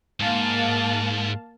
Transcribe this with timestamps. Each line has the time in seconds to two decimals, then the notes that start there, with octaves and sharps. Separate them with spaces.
0.20 G#2 A#3 F5 A5